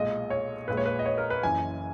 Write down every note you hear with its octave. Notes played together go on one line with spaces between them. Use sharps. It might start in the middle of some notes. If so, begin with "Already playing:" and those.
Already playing: B1 A#2 G#3 D#5
C#5
A#1 A#2 G#3 B4
C#5
B4
D#5
C#5
A#4
B4
F#1 F#2 E3 G#5